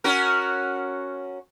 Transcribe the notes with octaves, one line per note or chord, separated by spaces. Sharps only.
C#4 F#4 A#4